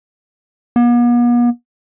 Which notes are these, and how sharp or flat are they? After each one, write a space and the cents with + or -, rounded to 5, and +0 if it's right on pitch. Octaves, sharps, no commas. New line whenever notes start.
B3 -45